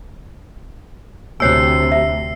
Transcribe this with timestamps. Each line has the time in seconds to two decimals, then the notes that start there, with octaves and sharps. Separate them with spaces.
1.40 D2 C3 C5 C#5 G#5 E6 C7
1.92 E5